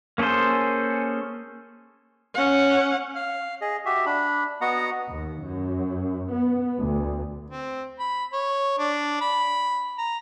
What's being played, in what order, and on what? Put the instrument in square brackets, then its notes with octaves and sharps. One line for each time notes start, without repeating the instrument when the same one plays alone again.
[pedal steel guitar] A#3 C#4 G#4 A4 C5
[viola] C#4 F#5
[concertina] F5 F6
G#4 D#5
F#4 G4 E5
D4 B5
B3 F#4 D#5 F#5 A#5
[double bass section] D#2
F#2
B3
D2
[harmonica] C4
B5
C#5
D4
B5
A#5